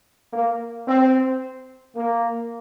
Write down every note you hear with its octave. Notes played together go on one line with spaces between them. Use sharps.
A#3
C4
A#3